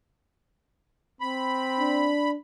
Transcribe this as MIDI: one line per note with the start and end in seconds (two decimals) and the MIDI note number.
1.21 2.17 60
1.21 2.30 83
1.80 2.36 62